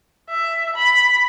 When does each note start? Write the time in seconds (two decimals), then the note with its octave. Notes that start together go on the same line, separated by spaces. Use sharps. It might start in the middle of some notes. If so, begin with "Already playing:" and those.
0.30 E5
0.76 B5